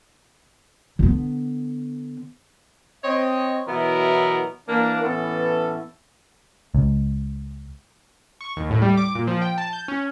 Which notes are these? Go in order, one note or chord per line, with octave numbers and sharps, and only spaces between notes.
D3 B3
C4 C#5 D#5
B2 E3 F#3 B3 E4 A#4
E3 A#3 D4
A2 E3 B3 C#4 A4
C#2
C#6
D#2
A2
G3
D6
A#2
F3
G5
A5
G6
C#4